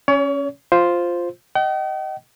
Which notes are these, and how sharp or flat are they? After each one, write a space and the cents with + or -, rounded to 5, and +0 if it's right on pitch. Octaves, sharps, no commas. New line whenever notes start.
C#4 +0 C#5 +35
F4 +0 C5 +0
D#5 +0 G5 -45